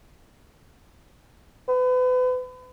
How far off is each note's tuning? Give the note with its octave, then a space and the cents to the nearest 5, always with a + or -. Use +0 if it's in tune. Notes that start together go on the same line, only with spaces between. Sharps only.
B4 +35